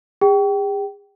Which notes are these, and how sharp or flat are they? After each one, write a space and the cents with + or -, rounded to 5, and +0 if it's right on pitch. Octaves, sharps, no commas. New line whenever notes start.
G#4 -45 G5 -20